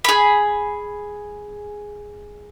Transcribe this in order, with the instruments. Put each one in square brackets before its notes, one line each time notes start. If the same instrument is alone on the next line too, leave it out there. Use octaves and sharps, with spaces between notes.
[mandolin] G#4 B5